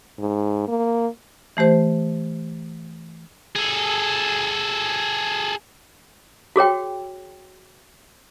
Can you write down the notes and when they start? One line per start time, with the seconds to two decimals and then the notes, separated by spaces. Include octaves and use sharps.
0.19 G#2
0.68 A#3
1.57 E3 A3 G4 C5
3.56 G#4 A4
6.56 F#4 G#4 C#5 G5